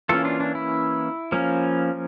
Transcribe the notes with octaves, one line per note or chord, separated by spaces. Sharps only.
E3 A#3 C#4 F4 A4
D4 F4
D4
E4
F3 A#3 C#4